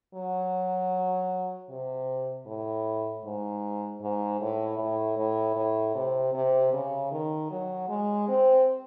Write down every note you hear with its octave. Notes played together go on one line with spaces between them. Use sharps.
F#3
C3
A2
G#2
G#2
A2
A2
A2
A2
C3
C3
C#3
D#3
F#3
G#3
C4